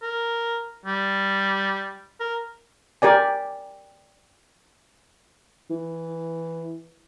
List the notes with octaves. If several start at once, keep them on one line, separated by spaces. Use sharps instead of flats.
A#4
G3
A#4
G4 A#4 D5 G#5
E3